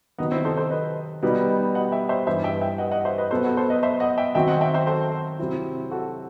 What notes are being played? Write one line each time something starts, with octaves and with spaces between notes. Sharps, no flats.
C3 D#3 F#3 B3 D#4
C4 E4
A4 C5
A4 C5
B4 D#5
B2 G3 B3 D#4
D#5 F#5
E5 G5
C5 E5
G2 E3 G3 C5 E5
E5 G5
E5 G5
D#5 F#5
D#5 F#5
C5 E5
B4 D#5
B2 F#3 B3 A4 C5
F#4 A4
A4 C5
B4 D#5
C5 E5
D#5 F#5
E5 G5
D#3 F#3 C4 F#4 E5 G5
D#5 F#5
E5 G5
C5 E5
A4 C5
C3 F#3 C4 E4
F#4 A4